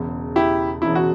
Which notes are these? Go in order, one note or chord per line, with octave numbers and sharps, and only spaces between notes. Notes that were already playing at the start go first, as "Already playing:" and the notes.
Already playing: E1 E2 C#3
E4 G4
E1 E2 C#3 E4
F#4